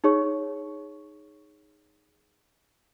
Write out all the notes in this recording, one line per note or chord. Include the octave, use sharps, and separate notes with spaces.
D#4 G#4 C#5 C#6